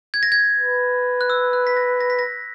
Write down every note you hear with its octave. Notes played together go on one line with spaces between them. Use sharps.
G#6
A#6
G#6
B4
F#6
E6
F#6
B6
A#6
A#6
B6
A#6